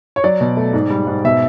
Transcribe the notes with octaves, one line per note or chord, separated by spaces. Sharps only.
C#5
F#3 D5
B2
A3
G#2
G3
G#2
B2 E5